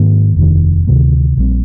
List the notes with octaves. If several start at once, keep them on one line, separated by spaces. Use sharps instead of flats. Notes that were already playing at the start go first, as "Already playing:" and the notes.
Already playing: G#2 D#3 A#3 D4
F1 D#2 D#3
D2 C3 D#3 A#3
A#1 A#2 G3 C4